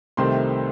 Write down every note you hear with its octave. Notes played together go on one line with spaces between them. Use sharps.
C2 C3 D#3 A3 C4 C6